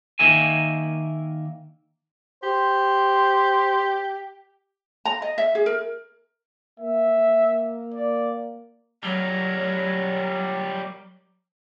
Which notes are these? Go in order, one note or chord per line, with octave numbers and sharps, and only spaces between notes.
D#3 A#3 A#4 E5 G#5
G4 C5
A#5
D#5
E5
G#4
A#4
A#3 E5
D5
F#3 G3 A#4